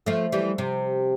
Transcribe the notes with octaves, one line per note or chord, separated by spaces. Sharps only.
F3 A3
E3 G3
C3